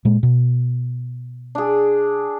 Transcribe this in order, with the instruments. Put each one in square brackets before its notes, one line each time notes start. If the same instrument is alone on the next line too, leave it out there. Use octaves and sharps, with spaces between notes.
[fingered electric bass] A#2 G#3
B2
[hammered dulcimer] D4 G#4